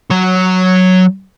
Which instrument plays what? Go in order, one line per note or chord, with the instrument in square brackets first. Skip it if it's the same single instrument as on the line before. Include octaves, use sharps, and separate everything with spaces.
[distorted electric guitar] F#3 C#5